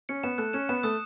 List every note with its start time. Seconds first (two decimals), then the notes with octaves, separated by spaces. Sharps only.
0.09 C#4 C#7
0.24 B3 E7
0.38 A3 F#6
0.53 C#4 E7
0.69 B3 E7
0.83 A3 D#6